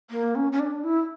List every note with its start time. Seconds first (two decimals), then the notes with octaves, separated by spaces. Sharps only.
0.11 A#3
0.35 C#4
0.52 C#4
0.60 D4
0.84 E4